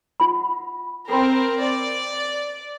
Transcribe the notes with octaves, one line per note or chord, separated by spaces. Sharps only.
F4 F#5 B5
C4 A4 A#4 B5 C6
D5